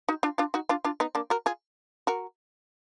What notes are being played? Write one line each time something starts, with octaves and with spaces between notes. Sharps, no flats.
D#4 F#4
D4 F4
D4 F4
D#4 F#4
D4 F4
D4 F4
B3 D#4
A#3 D4
F#4 A#4
F4 G#4
F#4 A#4